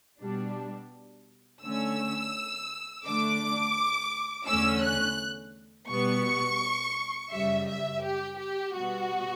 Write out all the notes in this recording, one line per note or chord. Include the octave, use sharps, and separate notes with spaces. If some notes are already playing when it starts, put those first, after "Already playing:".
B2 G3 D4
D3 A3 C#4 E6
D3 A3 D4 D6
E2 D3 A3 C#4 E6
F#6
B2 G3 B3 C#6
F#2 C#3 G3 E5
E5
G4
G4
B2 G3 B3 F#4